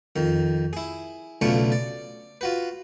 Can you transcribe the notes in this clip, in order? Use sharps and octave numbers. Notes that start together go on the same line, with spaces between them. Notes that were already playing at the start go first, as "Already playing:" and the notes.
F2 D#3
E4 G#4
B1 C#3 A3 D4 F4 C#6
D5
F4 F#4 B4